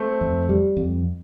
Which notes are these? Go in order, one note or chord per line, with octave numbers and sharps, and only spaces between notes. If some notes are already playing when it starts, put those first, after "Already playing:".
Already playing: A3 C4
F2
G3
F2